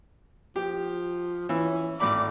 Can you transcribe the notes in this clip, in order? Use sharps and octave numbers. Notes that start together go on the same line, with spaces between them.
F3 G4
E3 C#4 E4
G#1 A2 D5 B5 D6